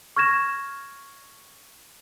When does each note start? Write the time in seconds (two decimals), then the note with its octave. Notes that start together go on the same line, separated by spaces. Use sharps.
0.16 C#6 F6 G#6 A#6 E7